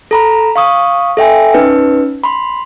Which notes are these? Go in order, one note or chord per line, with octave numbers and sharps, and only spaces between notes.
A4 A#5 B5
F5 C#6 D#6
A4 E5 G5 G#5
C#4 D#4 B4
B5 C6